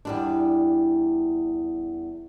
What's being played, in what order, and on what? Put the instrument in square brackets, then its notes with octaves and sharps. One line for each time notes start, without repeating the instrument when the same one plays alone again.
[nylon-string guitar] E2 G3 D4